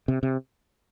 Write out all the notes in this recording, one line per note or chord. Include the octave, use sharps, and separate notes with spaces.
C3
C3